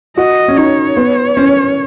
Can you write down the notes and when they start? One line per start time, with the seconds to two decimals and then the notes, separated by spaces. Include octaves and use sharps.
0.17 F#4 D#5
0.48 C#4
0.57 D#4 C#5
0.97 B3
1.37 C#4